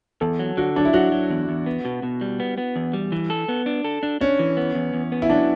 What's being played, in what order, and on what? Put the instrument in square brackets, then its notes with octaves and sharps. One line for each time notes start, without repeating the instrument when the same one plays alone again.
[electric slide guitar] E2 [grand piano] A4
[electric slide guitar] F#3
[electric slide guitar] D3 [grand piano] F#4
[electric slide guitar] F#3 [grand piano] D4
[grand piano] E4
[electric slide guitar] F#3 [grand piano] F#4
[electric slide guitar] F#3
E2
E2
B3
B2
B2
G3
B3
B3
E2
G3
E3
A4
B3
D4
A4
D4
[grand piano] C#4 [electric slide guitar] D4
[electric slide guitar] E3
B3
E2
E2
B3
[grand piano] E4
[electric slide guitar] F#3 [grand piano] D4